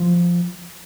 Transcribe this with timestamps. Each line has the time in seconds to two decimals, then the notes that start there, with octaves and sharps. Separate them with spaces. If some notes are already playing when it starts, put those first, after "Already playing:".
Already playing: F3